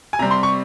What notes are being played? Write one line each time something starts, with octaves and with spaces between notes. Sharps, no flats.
G#5
C3 G3 C4 A#5
C6
C#6